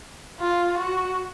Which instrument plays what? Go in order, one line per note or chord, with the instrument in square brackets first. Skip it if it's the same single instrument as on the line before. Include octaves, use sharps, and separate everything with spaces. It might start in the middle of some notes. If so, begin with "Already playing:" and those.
[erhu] F4
F#4